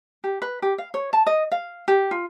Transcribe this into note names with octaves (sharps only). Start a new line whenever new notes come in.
G4
B4
G4
F5
C#5
A5
D#5
F5
G4
F4